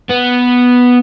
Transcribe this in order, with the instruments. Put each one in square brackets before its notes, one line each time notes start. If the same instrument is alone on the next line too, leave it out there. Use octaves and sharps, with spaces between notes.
[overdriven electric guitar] B3